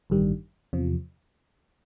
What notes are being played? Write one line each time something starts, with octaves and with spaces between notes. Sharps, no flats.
A1 G2 D#3 G3
E2 C3 F3